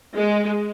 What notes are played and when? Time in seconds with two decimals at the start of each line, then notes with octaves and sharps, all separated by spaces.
0.17 G#3